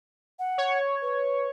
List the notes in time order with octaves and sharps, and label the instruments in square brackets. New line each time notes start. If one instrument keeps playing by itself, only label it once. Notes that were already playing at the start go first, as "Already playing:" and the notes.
[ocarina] F#5
[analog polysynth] C#5
[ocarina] B4